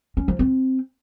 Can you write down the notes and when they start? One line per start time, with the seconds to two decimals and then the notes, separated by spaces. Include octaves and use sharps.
0.17 C#4
0.28 F3
0.39 C4